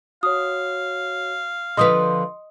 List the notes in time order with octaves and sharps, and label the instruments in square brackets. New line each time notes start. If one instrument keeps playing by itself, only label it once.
[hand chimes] F#4 C#5 [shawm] F5 [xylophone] D#6
[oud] D3 F3 B4 [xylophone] D#5 D#6 [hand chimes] C6